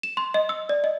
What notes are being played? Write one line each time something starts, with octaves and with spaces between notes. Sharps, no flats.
E7
C6
D#5
E6
D5
D#5